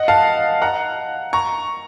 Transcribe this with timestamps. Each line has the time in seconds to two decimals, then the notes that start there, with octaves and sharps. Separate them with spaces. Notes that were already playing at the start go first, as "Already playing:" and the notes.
Already playing: D#5 F#5
0.08 F5 A5
0.62 F#5 A#5
1.33 A#5 C#6